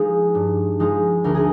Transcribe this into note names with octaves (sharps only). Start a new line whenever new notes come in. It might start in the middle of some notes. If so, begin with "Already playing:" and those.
Already playing: F3 G#3 D#4 G#4
G2
F3 G#3 D#4
D2 A#4
G#4